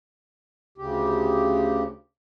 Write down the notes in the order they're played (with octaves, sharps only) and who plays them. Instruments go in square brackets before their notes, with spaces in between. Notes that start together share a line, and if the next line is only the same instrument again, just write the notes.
[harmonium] D2 C#3 G4